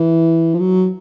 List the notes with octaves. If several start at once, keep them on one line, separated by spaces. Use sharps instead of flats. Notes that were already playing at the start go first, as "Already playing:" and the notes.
Already playing: E3
F3
F#3